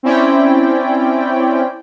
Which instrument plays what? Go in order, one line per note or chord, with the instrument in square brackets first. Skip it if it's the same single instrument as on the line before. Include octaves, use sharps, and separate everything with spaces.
[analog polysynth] C4 C#4 E4 D5 G5